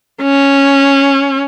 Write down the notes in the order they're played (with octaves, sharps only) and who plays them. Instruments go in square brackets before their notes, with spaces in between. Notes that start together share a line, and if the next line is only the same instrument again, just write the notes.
[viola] C#4